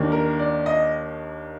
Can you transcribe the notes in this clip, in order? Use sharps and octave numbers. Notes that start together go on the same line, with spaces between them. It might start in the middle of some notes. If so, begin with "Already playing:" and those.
Already playing: D#2 D#3 A#3 D4
A#4
D5
D#5